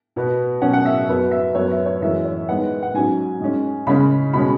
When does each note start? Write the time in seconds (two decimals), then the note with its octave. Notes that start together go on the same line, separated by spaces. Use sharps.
0.16 B2 B3
0.62 B2 F#3 C#4 F#5
0.73 F#5
0.85 E5
1.09 F#2 F#3 B3
1.31 E5
1.55 F#2 F#3 B3 C#5
1.71 E5
1.86 C#5
2.02 F#2 E3 G#3 E5
2.25 C#5
2.49 G#2 G#3 B3 F#5
2.83 F#5
2.95 G#2 F#3 C#4 G#5
3.41 G#2 G#3 C#4
3.87 C#3 G#3 C#4 B5
4.33 B2 G#3 C#4 B5